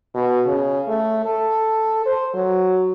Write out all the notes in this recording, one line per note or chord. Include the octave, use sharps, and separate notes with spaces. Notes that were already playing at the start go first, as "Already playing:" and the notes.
B2
C#3
A3
A4
C5
F#3